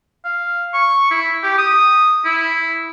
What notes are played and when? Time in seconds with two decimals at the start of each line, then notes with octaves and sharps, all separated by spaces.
0.25 F5
0.73 C#6
1.11 E4
1.43 G4
1.58 D#6
2.25 E4